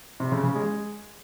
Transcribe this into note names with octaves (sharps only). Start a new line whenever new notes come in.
C3
C#3
C#3
G#3